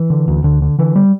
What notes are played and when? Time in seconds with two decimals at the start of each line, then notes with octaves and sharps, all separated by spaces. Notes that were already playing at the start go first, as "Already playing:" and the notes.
Already playing: E3
0.10 D3
0.28 D2
0.44 D2 D3
0.62 D3
0.79 D3 E3
0.96 G3